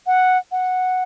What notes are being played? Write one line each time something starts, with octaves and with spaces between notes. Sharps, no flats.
F#5
F#5